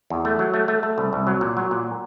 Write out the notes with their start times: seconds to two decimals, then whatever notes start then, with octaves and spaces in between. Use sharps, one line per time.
0.10 E2
0.25 A3
0.39 F#3
0.54 A3
0.68 A3
0.83 A3
0.98 C2
1.13 C2
1.27 F#3
1.41 A#2
1.57 F#3
1.71 A#2